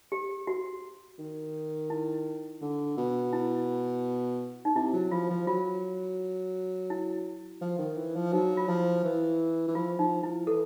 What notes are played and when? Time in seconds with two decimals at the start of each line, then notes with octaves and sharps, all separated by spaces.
0.12 G4
0.47 F#4
1.19 D#3
1.90 E4
2.61 D3
2.98 B2
3.33 E4
4.65 D#4
4.75 C3 E4
4.93 F#3
5.11 F3 F4
5.30 F3
5.47 F#3 F4
6.90 E4
7.61 F3
7.79 D#3
7.97 E3
8.16 F3
8.33 F#3 D#4
8.57 F4
8.68 F3 E4
9.05 E3
9.68 E3
9.75 F3 F4
9.99 F3 D#4
10.23 F3 E4
10.47 E3 A4